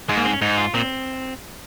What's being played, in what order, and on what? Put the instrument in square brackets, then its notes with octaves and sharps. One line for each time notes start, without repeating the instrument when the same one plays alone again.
[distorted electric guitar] G#2 [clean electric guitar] G#3
[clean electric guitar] A#3
C4
C#4
[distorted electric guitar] G#2 [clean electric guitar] D#4
[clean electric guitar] F4
[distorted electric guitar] A#2 [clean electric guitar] C4